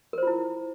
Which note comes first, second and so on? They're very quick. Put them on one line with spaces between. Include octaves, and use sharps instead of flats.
A#4 C5 F4 E4